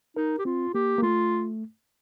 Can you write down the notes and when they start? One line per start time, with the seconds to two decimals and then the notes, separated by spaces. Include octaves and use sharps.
0.17 D#4 A#4
0.39 G4
0.45 C4 F4
0.75 A#3 G4
0.98 A#3
1.02 A3 F4